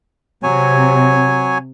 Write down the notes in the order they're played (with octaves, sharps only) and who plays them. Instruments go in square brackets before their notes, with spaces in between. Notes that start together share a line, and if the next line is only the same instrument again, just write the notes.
[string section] C3 [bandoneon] F#3 C#5 G#5